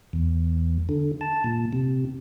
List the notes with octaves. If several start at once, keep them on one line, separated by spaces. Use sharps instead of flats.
E2
D3
A5
A#2
C3